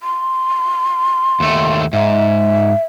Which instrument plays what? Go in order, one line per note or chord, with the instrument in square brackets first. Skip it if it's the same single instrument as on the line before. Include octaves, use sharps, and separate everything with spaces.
[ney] C6
[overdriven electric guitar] D#2 A3
[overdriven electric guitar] G#2 [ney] E5